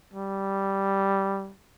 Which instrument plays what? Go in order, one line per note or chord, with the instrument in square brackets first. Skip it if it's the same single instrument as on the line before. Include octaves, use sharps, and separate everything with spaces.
[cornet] G3